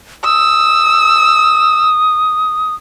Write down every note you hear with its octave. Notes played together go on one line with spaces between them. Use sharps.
D#6 E6